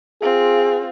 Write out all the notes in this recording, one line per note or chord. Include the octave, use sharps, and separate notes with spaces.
C4 F4 G#4